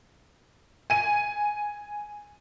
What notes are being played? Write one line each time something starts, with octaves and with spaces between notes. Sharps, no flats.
G#5 D#7